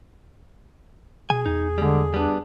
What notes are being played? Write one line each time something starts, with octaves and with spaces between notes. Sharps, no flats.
B2 G#4 G#5
E2 D#4
D3 G3 G#3
G3 B3 D4